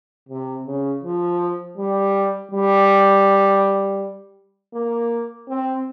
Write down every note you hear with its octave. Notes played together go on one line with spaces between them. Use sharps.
C3
C#3
F3
G3
G3
A#3
C4